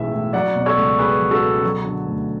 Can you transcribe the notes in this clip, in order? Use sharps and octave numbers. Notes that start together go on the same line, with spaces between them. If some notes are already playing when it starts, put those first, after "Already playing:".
Already playing: B1 A2 E3 G#3 E5
A2
F#3 D5 F#5
B2 D5
A4 C#5
C#2
C#2 G#4 B4
F#3
F#4 A4
B2
F#3
D3
D2